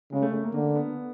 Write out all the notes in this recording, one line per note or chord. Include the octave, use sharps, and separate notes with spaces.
C#3 G#3
A3
A3
A#3
D3 A#3
B3